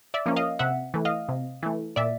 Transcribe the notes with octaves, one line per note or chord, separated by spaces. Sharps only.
D5 E5
F3 A#3 C#4
D#5 F5
C3 E5 F#5
E3 A3
D#5 F5
C3
E3 A3
A#2 D5 E5